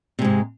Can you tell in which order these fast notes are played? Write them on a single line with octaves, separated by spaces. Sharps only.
C3 G#3 G#2